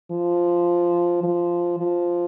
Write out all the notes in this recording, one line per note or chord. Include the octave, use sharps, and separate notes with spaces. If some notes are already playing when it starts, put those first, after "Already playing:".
F3
F3
F3